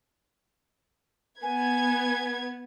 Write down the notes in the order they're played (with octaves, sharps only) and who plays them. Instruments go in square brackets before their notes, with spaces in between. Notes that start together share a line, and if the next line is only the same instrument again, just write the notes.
[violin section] B3 B4 G#6 [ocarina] G#5